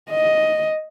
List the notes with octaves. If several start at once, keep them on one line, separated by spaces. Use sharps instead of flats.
D#5